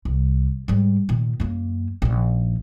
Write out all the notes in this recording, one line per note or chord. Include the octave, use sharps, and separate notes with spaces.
C2
G#2 G3
A#2 D#3
F#2 A#3
A#1 D#4